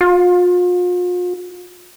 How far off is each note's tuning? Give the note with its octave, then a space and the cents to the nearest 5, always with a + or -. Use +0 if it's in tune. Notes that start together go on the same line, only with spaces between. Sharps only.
F4 +40